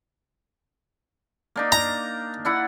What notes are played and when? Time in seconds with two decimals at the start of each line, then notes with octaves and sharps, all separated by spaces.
1.56 A#3 D4 D#4
1.72 A#5
2.45 D4 E4 F#5